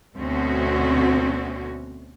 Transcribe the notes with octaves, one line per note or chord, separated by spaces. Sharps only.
D2 B2 C4 C#4 F#4